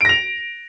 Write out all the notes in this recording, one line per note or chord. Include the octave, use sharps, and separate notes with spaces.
A#6 D7 F7